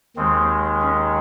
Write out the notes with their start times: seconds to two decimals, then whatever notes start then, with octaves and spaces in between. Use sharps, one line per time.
0.16 D#2 D#3 G#3 C4
0.81 C#4